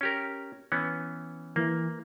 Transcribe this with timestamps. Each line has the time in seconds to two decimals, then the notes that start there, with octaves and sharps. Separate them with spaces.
0.01 C#4 G4 A#4
0.72 E3 B3 C#4
1.56 E3 A#3